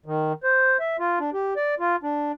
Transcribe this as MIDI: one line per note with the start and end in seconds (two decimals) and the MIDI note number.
0.06 0.33 51
0.44 0.77 72
0.80 0.97 76
0.99 1.19 65
1.20 1.30 62
1.33 1.54 67
1.57 1.75 74
1.80 1.96 65
2.03 2.32 62